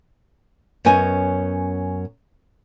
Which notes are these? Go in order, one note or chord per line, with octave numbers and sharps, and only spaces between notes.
F#2 B3 C#4 D#5 G#5